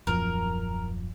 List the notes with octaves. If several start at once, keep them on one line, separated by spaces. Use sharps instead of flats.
D#1 F#2 F3 A#4